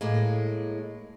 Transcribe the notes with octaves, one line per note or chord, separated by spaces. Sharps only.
A2 G#3 A#3